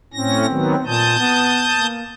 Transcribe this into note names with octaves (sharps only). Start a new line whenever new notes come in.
A2 C4 C#4 A#6
D#3 F#3 B3
A#2 A5 D#6 G6
B3
A#3